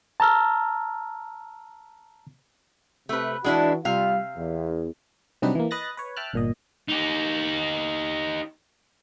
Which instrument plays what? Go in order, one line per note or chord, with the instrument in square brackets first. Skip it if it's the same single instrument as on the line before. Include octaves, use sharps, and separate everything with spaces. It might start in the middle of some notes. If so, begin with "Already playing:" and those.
[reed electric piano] A5 A#5 E6 F6
[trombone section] C3 [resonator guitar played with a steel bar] A3 B4
[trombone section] E3 F#4 [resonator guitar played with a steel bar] G#3 D4 E4
[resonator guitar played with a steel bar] C3 F5 [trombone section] G3 F4
[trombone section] E2
[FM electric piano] C3 F#3 G3 D4 D#4 B4
E3 A#3
B4 D#5 F#6 A6 A#6
B4 C#5
E5 G5 A5 F6 F#6
G1 A#2 D#5
[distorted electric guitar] D#4 G4